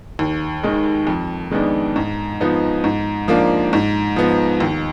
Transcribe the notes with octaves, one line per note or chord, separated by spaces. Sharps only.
D#2
D#3 G#3
F2
D#3 G#3 B3 D4
G#2
F3 B3 D#4
G#2
F3 A#3 D4
G#2
F3 B3
D#2